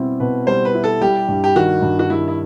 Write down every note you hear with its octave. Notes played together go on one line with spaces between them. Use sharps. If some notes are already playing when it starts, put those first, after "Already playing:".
Already playing: B2 G3 C4 E4
B2 B4
G3 C5
B4
E4
A4
G3 G4
G2
G4
D#3 F#4
G2
F#4
G3 E4
E4